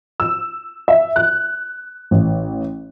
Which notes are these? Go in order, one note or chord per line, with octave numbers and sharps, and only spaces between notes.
E6
E5
F#6
A1